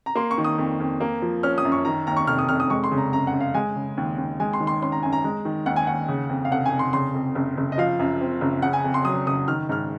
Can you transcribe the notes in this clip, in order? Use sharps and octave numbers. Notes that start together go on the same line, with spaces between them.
A#5
A#3 C6
C#6
D#3
D#6
F2
F2
A#3
F3
C#4 F6
D#6
F#2
C#6
D#3 A#5
D#2 A#5
C#6
F1 F6
D#6
F1 F6
D#6
G#3 C#6
C6
C#3
A#5
F#2 A#5
F#5
F#2
F5
G#3 G#5
C#3
D#2
D#2
G#3 G#5
C6
D#3
C6
C#4 C6
A#5
F#2 G#5
A#5
G#3
D#3
D#2 F#5
G#5
D#2 F#5
C#3
F2
F5
F1 F#5
G#5
F1
C6
C#3 C6
F2
F#1
F#1
D#5
F3 F5
F#2
C4
F#1
C#3 F#5
G#5
F2
C6
F#3 D#6
F#1 D#6
D#3 F6
G#2 F6